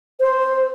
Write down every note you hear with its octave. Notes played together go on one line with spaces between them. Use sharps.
C5